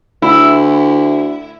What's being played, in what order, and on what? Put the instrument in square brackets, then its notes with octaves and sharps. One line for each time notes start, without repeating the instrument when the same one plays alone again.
[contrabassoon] D2 [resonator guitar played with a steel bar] E4